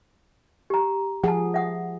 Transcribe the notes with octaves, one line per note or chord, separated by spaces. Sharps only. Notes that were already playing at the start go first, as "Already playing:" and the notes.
G4 A#5
F3 G#4 F#5 A5
E5 F#5 D#6